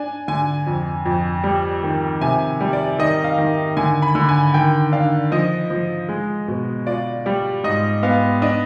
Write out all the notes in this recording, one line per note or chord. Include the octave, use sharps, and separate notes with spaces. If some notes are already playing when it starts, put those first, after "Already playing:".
Already playing: D4 G#5
D3 G#5
F2
F2
G3
D#3
C3 G#5
G3
D5
D#3 D#5
F5
D#3
D3 G#5
B5
D3
G#5
D#3 G5
D4 F5
F3 D#5
F3
G#3
B2
F4 D5
G3 D5
G#2 D#5
B3 F5
D4 D#5